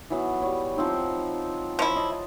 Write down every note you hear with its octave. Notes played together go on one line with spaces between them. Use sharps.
E3 F#3 B3
G3 C#5
F3 C4 D#4
F3 E4 C5 C#5
C5 D#5 A5